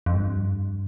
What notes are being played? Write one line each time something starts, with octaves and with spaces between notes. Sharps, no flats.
F2
G2